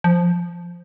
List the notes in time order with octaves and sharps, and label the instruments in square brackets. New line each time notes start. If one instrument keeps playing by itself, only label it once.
[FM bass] F3